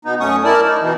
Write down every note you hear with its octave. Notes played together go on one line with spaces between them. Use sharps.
B2 B3 D#4
F#2 A3 C#4 C#6 D#6
E4 A#4 D5 A5
D#4
B2 E3